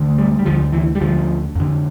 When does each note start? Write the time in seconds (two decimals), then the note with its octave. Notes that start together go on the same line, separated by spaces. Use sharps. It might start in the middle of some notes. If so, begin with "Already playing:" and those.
Already playing: D2 D3
0.18 G3
0.39 G3
0.46 D2 D3 F3
0.73 E3
0.95 G3
1.01 D2 D3 F3
1.56 F2 D3